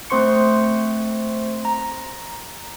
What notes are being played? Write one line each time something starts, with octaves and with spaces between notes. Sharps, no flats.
A3 C4 C5 C6 C#6 C#7
A#5